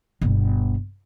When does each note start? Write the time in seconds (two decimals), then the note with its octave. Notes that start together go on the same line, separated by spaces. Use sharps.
0.21 G1 B2